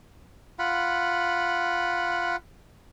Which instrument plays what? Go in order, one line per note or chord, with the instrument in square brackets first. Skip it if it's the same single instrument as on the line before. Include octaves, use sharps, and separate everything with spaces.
[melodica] F4 F#5 B5